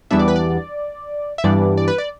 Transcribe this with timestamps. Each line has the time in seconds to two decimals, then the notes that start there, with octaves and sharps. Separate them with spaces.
0.11 E2 E3 G3 B3 D4 E5
0.19 D5
0.28 B4
0.36 D5
1.38 E5
1.44 G2 E3 G3 B3 D4 D5
1.78 D5
1.88 B4
1.98 D5